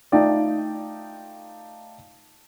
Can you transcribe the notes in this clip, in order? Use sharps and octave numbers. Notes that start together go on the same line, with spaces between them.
A3 D#4 F4 D5 G5